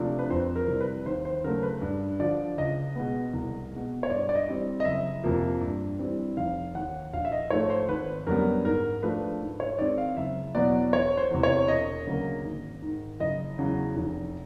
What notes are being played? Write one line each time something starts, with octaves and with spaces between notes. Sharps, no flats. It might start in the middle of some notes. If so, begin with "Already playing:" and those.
Already playing: C3 F3 A3 D4
B4
F2 C5
A#4
C3 E3 G3 C4
B4
D#2 C5
C5
C#3 F#3 A3 A#4
B4
G2
D3 F3 D5
C#2 D#5
B2 G#3 B3
C2
G#3
B2
C#5
G2 D5
D5
D#5
E3 G3 C4
D#5
F#1 E5
F2 C3 F3 A#3
G2
E3 G3 C4
F1 F5
D#2 D#3 F#5
A#1 F5
E5
D#5
G#2 F3 A3 C#5
C5
G#1 B4
F#2 D3 G3 B3 A#4
G#2 A#4
F3 A3 D4 B4
G#2
C#5
D#3 G#3 C4 D5
F5
F#1 E5
E2 B2 F#3 B3 D5
E1 C#5
C5
E2 C3
C#5
E1 D#5
D2 C#3 F#3 A#3
G#1
G#2 D#3
F#1 D#5
E2 C#3 F#3
F1